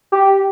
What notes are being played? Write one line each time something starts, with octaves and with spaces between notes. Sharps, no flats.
G4